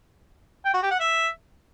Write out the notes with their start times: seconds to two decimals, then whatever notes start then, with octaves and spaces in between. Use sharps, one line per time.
0.65 G5
0.74 F#4
0.83 G4
0.91 F#5
1.00 E5